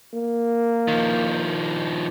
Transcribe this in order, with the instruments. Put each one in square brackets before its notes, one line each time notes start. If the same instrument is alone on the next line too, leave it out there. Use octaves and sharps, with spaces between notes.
[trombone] A#3
[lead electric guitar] D#3 F3